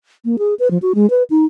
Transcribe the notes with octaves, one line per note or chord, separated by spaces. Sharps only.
A#3
G#4
B4
F3
F#4
G#3
B4
D#4